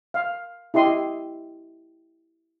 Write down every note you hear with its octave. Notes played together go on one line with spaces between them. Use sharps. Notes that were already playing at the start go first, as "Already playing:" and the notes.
F5
E4 G4 D#5 C6 D#6